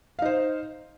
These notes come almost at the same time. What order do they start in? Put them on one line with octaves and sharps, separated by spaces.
F5 D#4 C5